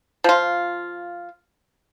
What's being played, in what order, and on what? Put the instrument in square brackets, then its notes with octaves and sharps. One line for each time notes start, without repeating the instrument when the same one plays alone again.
[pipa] F3 F4